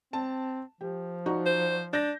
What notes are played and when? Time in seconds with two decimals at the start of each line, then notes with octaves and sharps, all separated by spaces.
0.13 C4 A5
0.81 F3 G4
1.26 D#4 F#4 D5
1.46 C5
1.93 D4 G6 A#6